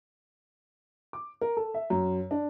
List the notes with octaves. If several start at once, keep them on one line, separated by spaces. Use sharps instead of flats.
D6
A#4
A4
E5
F#2
D4